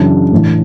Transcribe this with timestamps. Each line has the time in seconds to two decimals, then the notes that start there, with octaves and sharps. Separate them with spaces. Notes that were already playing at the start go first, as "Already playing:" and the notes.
Already playing: F#2 C#3 E3 D4
0.32 A2 E3